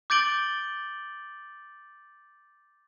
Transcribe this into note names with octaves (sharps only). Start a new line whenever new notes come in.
D6 G6 A6 D7 F#7 G7